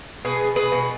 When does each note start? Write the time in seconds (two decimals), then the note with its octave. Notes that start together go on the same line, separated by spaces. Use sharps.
0.25 B2 G#4 B4
0.56 G#4 B4
0.72 B2